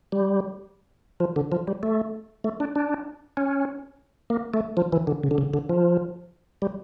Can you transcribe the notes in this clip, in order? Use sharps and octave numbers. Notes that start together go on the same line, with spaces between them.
G3
F3
D3
F3
G3
A3
A3
D4
D4
C#4
A#3
A3
F3
E3
D3
C#3
D3
C#3
D3
F3
G3